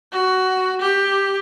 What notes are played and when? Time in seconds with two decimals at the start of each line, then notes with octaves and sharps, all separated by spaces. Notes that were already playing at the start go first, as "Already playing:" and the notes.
0.12 F#4
0.81 G4